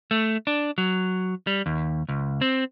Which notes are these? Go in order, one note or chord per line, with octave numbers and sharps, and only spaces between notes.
A3
D4
F#3
G3
D#2
C#2
C4